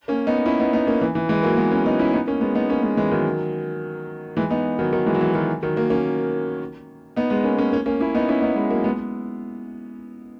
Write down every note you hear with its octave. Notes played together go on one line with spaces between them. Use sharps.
A#3 C#4
B3 D#4
C#4 E4
B3 D#4
B3 D#4
A#3 C#4
E3
E3
E3 G#3
F#3 A#3
G#3 B3
A#3 C#4
B3 D#4
C#4 E4
B3 D#4
A#3 C#4
G#3 B3
B3 D#4
A#3 C#4
G#3 B3
E3 G#3
D#3 F#3
E3 G#3
B3 D#4
D#3 F#3
D#3 F#3
E3 G#3
F#3
E3
D#3 F#3
D#3 F#3
F#3 A#3
A#3 C#4
B3 D#4
G#3 B3
A#3 C#4
A#3 C#4
A#3 C#4
A#3 C#4
C#4 E4
B3 D#4
C#4 E4
B3 D#4
G#3 B3
F#3 A#3
G#3 B3